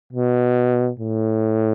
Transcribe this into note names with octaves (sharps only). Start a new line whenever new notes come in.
B2
A2